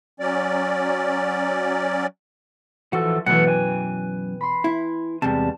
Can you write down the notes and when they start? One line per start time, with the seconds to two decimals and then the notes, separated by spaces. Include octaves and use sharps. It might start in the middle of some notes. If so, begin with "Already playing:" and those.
0.20 F#3 C#4 D5
2.93 E3 F3 F#4 A4
3.26 F#2 B2 E3 A3 F#5
3.47 B4 G5 G#5
4.41 B5 C6
4.64 E4
5.22 E2 C3 G3 G#3 A5